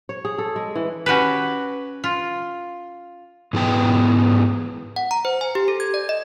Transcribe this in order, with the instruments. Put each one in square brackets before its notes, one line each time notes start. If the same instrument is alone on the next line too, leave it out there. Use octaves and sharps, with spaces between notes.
[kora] C#5
G#4
A4
G#3
E3
[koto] C#4 F#4 G4 B4
F4
[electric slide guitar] G#2 E3 G#3 B3 G5
[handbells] F#5
A#5
C5
G#5
G4
A4
G#6
D5
D#5